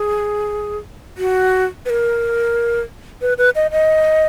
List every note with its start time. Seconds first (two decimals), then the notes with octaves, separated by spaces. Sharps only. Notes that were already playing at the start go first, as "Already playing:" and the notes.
Already playing: G#4
1.18 F#4
1.86 B4
1.90 A#4
3.22 B4
3.38 B4
3.56 D#5
3.71 D#5